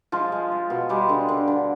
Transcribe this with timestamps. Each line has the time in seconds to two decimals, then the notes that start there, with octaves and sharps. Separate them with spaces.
0.12 F3 G#3 F4
0.32 G#3
0.52 G#3
0.70 B2
0.89 G3 G#3 G4
1.09 D3
1.29 D3
1.48 D3